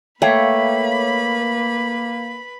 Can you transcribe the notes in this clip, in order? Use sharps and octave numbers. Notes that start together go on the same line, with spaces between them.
A3 A#3 B4 C#5 F5 G5 B5